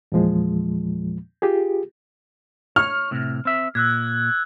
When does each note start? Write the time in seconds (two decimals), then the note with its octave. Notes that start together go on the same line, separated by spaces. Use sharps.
0.12 E2 A#2 F3 G#3
1.42 F4 G4 G#4
2.76 C#5 F6
3.11 A2 C3
3.45 C4 E5
3.75 A#2 E6 F#6 G#6